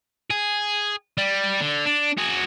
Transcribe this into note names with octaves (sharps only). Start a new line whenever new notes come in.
G#4
G3
D3
D4
F#4 G#4